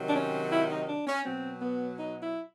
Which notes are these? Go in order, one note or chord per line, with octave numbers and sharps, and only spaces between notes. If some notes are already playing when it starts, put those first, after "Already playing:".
Already playing: C3 D#3 F#3
D4
C#4
E4
D#4
D4
C#4
B2 F#3 C4
B3
D#4
E4